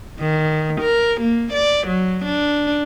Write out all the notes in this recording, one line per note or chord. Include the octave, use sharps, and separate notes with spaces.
D#3
A#4
A#3
D5
F#3
D4